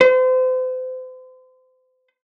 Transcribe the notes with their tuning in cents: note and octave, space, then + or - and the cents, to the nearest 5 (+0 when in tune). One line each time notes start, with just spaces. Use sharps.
C5 -35